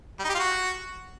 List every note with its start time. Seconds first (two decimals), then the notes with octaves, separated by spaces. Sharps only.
0.19 G3
0.24 D#4
0.29 G4
0.34 F4
0.39 F#4